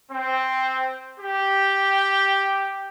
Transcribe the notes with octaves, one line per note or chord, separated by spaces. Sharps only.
C4
G4